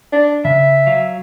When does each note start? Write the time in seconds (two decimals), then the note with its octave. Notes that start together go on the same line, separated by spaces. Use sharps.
0.12 D4
0.45 C#3 E5
0.87 F#3 F5